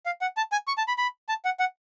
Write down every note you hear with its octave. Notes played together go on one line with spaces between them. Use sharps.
F5
F#5
A5
G#5
C#6
A5
B5
B5
A5
F#5
F#5